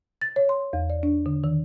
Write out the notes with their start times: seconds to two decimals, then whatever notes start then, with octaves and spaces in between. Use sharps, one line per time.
0.22 A6
0.36 C#5
0.49 C6
0.73 E2
0.90 D5
1.03 D4
1.26 D3
1.44 D#3